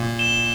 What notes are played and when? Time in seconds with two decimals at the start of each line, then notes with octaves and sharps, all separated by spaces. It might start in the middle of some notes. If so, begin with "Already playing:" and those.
Already playing: A#2
0.19 E7 G7